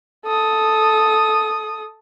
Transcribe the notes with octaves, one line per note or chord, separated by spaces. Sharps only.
A4 D#6